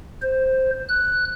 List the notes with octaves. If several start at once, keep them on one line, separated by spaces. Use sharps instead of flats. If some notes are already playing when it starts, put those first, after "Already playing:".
C5
F#6